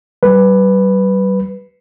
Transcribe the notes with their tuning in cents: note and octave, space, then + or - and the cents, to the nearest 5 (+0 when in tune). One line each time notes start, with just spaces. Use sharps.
G3 -40 B4 +0